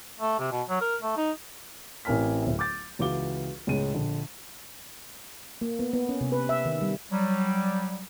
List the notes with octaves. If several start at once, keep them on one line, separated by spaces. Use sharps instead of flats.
A3
C3
B2
F#3
A#4
A3
D#4
A1 C4 A#4 G#5 F6 B6
D1 E5
D6 G6 A6
C#2 E3 F#4 F5 D6 G7
C#2 A2 G#3 C#4 D#7
A#1 D3 F3
A#3
B3
B3
C#4
C3
B4
E5
D#3
G3
F#3 G3